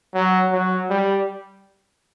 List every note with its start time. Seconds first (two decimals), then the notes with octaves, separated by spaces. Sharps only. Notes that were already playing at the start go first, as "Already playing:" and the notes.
0.14 F#3
0.52 F#3
0.90 G3